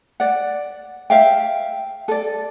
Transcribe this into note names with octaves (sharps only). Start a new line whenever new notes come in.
D5 F#5
E5 F5 G5
A4 D5